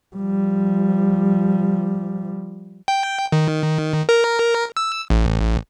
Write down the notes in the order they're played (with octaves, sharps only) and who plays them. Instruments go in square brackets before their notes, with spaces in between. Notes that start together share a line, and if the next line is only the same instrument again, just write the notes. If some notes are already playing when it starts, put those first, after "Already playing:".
[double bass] F3 G3
[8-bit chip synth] G5
D#3
A#4
E6
A1